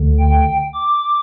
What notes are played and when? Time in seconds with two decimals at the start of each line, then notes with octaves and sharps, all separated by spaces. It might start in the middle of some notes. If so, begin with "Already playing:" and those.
Already playing: D2 D3
0.19 G5
0.74 D6